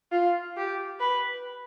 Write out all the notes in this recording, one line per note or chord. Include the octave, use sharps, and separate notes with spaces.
F4
G4
B4